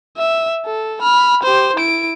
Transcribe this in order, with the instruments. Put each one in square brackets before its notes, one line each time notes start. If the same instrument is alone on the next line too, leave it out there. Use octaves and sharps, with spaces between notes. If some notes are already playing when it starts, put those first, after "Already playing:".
[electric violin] E5
A4
B5 F6
G4 C5
E4 D7